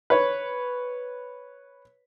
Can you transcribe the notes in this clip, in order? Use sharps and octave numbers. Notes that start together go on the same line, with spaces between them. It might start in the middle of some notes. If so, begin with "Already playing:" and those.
B4 C#5